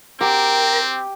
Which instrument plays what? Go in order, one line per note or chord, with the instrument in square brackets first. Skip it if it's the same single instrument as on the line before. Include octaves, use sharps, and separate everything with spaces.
[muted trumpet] C4 [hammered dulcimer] G4 [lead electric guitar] A#4